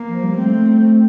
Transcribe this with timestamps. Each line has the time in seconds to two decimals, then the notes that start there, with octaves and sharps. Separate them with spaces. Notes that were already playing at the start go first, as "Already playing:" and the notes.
Already playing: A#3
0.08 F3
0.23 G3
0.38 A3 C4